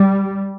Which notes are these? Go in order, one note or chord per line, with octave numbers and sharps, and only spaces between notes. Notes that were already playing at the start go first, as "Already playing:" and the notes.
Already playing: G3